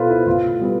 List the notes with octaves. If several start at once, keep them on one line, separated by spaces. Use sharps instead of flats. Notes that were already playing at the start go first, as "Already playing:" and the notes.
Already playing: B2 B3 F4 A4 B4 C5
E4
A2 F4
G3 B3